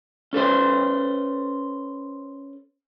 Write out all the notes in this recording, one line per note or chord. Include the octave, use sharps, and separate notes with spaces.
C#4 A4 B4 C5